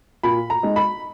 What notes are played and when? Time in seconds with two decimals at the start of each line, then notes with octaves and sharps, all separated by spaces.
0.23 A#2 B5
0.50 A#5
0.63 G#3 D#4
0.76 B5